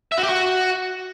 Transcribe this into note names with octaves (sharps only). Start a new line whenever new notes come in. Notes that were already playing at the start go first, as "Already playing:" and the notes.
E5
F#4
G4
F#4